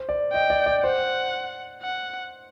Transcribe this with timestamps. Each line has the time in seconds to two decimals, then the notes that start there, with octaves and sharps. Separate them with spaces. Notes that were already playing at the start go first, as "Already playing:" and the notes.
Already playing: C5
0.09 D5
0.33 D#5 G5
0.50 D5
0.66 D5
0.83 C5 F#5
1.82 F#5